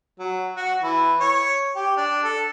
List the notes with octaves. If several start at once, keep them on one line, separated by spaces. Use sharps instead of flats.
F#3
F#4
E3
C#5
G4
D4
A4